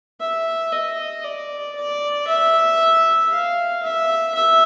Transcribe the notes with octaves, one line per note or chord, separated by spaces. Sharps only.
E5
D#5
D5
D5
E5
F5
E5
E5